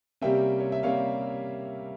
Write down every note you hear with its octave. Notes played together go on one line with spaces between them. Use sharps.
C3 G3 A#3 C#4 E5 G5
C#5
E5
C3 G3 A#3 C#4 C#5 F5